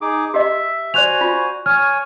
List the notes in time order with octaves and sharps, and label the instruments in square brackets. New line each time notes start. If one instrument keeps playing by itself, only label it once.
[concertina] D#4 G#4 D6
[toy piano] G4 D#5 [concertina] E5
[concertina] F#4 C5 G#5 [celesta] D5 F#6 F7
[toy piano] F4
[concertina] C#5 G#5 [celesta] F6